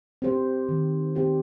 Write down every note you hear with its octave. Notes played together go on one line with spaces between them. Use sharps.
C4 G4 C5
D#3
C4 G4 C5